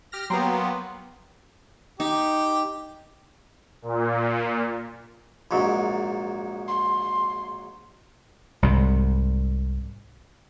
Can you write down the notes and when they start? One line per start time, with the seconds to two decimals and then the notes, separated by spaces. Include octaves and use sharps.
0.12 G4 F6 A#6
0.30 F#3 A#3 B3 G5 A#5 C6
2.00 D#4 G4
3.82 A#2
5.51 A#1 G#2 F#3
6.68 C6
8.62 C2 G#2 C3